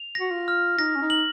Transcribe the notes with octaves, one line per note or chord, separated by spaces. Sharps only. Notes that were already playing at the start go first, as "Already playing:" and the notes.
Already playing: F7
A#6
F#4
F4
F6
D#4 A#6
C#4
D#4
F#7